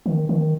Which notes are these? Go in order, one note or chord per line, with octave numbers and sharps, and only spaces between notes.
D#3
D#3